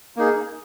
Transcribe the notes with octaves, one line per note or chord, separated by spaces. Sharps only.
A#3 D#4 G#4